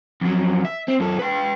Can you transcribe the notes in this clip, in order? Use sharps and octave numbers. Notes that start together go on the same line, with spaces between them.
F2 F#3
E5
C4
F#2 A4
B4 G5